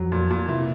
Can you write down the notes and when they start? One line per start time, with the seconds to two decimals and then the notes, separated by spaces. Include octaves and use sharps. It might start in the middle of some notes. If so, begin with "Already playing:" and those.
Already playing: F2 F3 F#3
0.12 A#2
0.31 A#2
0.48 C3 E3